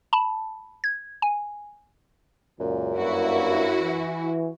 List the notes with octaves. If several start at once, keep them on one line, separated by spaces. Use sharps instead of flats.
A5 B5
G#6
G#5
C#2 F#2 A#2
G2 A#3 E4 F#4
E3